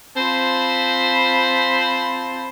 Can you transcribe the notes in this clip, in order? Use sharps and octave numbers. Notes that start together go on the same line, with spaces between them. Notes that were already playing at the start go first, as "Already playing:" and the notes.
C4 F4 C5 A5 B5